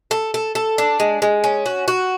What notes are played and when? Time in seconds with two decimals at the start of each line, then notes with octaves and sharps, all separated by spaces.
0.11 A4
0.34 A4
0.55 A4
0.78 D4
1.00 G#3
1.22 G#3
1.44 C#4
1.66 F#4
1.88 F#4